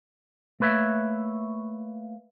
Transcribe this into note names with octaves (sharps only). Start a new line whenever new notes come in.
A3 A#3 B4 C#5 E5